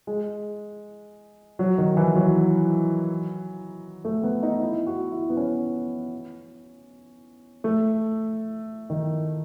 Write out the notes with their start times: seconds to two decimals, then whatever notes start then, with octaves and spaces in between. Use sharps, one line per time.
0.07 G#3
1.59 F#3
1.78 D#3
1.97 E3
2.16 F#3
4.05 A3
4.23 B3
4.43 D#4
4.62 E4
4.87 F#4
5.12 E4
5.30 B3
5.37 C#4
7.64 A3
8.90 D#3